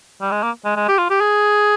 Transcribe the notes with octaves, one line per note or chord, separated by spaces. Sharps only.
G3
G#3
A#3
G#3
G#3
G4
F4
G4
G#4